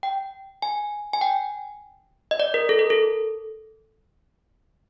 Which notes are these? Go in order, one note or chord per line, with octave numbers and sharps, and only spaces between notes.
G5
G#5
G#5
G5
D#5
D5
A#4
A4
A#4
A4